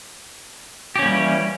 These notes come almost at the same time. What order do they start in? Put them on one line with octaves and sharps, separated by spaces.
G4 C#4 A#3 G3 E3